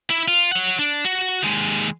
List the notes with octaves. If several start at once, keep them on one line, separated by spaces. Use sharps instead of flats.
E4
F4
C#5 F#5
D4
F#4
D#2 G#3